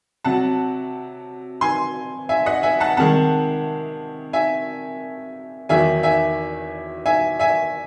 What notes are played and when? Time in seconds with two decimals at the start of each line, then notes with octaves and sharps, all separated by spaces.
0.25 C3 F#3 F#5 A5
1.61 G#5 C6
2.29 E5 G#5
2.46 D#5 F#5
2.63 E5 G#5
2.80 F#5 A5
2.97 C3 D#3 G#3 F#5 A5
4.33 E5 G#5
5.69 E2 D#3 F#3 E5 G#5
6.03 E5 G#5
7.06 E5 G#5
7.40 E5 G#5